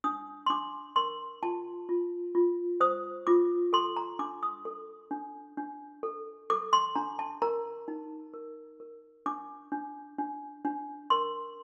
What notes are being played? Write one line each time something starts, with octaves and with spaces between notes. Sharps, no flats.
D4 D#6
C6
D4 D6
A#4 C6
F4 A5
F4
F4
C5 D#6
F4 D6
A4 C6
A#5
D4 D6
D#6
A4
D4
D4
A4
A4 D6
C6
D4 A#5
A5
A#4 A#5
D#4
A#4
A#4
D4 D6
D4
D4
D4
A#4 C6